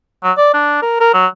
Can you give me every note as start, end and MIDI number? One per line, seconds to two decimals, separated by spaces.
0.23 0.32 54
0.37 0.52 74
0.54 0.78 62
0.82 0.97 70
1.00 1.12 70
1.14 1.26 54